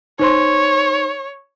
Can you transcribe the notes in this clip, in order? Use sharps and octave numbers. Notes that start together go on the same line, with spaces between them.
D#4 C5 C#5 C6